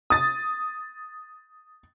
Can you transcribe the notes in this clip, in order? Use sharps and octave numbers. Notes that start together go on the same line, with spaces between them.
D#6 A6